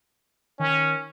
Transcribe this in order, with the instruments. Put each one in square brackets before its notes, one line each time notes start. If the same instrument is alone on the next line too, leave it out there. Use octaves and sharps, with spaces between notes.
[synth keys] D#3 [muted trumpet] C#4